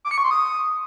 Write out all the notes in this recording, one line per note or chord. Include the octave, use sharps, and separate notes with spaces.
D6
C#7
C#6
C6
D#6